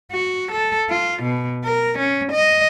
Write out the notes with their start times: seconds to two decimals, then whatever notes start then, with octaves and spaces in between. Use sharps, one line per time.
0.12 F#4
0.52 A4
0.90 F4
1.22 B2
1.64 A#4
1.98 C#4
2.32 D#5